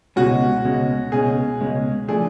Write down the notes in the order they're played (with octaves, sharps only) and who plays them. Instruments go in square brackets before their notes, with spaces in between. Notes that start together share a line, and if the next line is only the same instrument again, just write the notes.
[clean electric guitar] C#2 B2 G#3 C#4 [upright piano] F#4
[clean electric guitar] C#2 B2 G#3 C#4
[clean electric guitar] C#2 B2 G#3 C#4 [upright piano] G#4
[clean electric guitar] C#2 B2 G#3 C#4
[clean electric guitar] F3 A3 D4 [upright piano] G#4